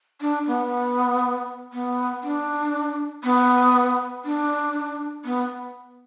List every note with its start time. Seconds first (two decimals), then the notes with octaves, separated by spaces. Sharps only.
0.21 D4
0.47 B3
1.73 B3
2.24 D4
3.24 B3
4.25 D4
5.25 B3